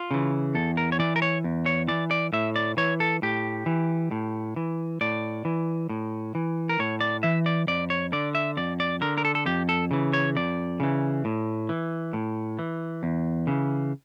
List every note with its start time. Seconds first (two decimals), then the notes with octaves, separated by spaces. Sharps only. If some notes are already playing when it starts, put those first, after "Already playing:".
Already playing: F4
0.11 C#3 E3
0.55 E2 A4
0.77 A#4
0.92 C#5
0.99 E3 D5
1.16 A#4
1.22 C#5
1.44 E2
1.66 C#5
1.88 E3 D5
2.11 D5
2.33 A2 E5
2.56 D5
2.77 E3 C#5
3.00 A4
3.22 A2 G4
3.66 E3
4.11 A2
4.56 E3
5.01 A2 D5
5.45 E3
5.89 A2
6.35 E3
6.69 A#4
6.79 A2 C#5
7.01 D5
7.23 E3 E5
7.46 D5
7.67 F2 D5
7.90 C#5
8.13 D3 D5
8.35 E5
8.57 F2 D5
8.80 D5
9.01 D3 A#4
9.18 A#4
9.25 A4
9.35 A4
9.46 F2 G4
9.69 A4
9.91 C#3 E3
10.13 C#5
10.36 F2 D5
10.80 C#3 E3
11.25 A2
11.69 E3
12.13 A2
12.59 E3
13.03 E2
13.47 C#3 E3